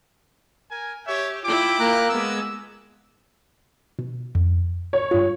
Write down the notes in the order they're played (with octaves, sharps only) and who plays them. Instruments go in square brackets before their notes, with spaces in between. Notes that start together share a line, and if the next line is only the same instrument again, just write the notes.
[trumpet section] A#4 G#5
[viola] G4 [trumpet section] C#5 E5
[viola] E4 F4 [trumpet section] G5 D6
[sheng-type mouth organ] A#3 A#5 F#6
[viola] G#3 B3 [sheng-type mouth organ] E6
[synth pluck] B2
F2
[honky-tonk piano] C#5
[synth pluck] G2 F4